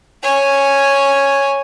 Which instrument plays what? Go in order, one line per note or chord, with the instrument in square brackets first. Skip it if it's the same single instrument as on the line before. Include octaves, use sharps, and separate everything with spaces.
[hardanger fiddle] C#5 G#5